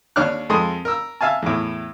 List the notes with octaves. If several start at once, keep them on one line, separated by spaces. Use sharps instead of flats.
D#2 D4 C#5 D6 F6 F#6
F2 G#3 A4 C6 D#6
A#4 E6
E5 F5 G#5 A5
E2 A2